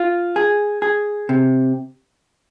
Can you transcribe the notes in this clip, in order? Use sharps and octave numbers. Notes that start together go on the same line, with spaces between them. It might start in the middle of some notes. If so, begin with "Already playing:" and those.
Already playing: F4
G#4
G#4
C3